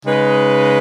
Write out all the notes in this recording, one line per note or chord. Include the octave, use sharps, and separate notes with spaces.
C#3 G#3 D#4 B4